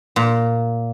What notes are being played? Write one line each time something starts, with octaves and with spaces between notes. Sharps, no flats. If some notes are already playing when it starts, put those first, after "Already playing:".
A#2